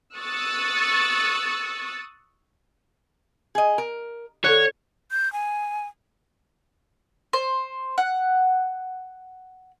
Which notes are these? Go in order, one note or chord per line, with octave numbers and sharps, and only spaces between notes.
C#6 D#6 E6 F#6 A6 C#7
G#4 D#5
A#4
D3 A4 C#5 F#6
G6
G#5
C5
F#5